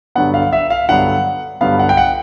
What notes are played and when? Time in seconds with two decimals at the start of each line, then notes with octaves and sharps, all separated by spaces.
0.15 G2 D3 F#3 B3 F#5
0.34 F5
0.53 E5
0.70 F5
0.88 G2 D3 F#3 B3 F#5
1.61 G2 D3 F#3 B3 F5
1.79 F#5
1.89 G5
1.97 F#5